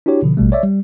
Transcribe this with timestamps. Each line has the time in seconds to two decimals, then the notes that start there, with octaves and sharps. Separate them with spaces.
0.06 D4 E4 F#4 G4 C#5
0.22 B2 D3 F3
0.37 A1 B2 G3 A3
0.52 C#5 D5 E5
0.63 G3